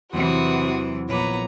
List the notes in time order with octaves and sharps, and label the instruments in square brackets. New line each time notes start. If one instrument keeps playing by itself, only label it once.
[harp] E2 F#3 C6 [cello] C3 E3 [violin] F#4 D#6
[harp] A#1 D6 [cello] B3 B4 [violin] C#5 A#5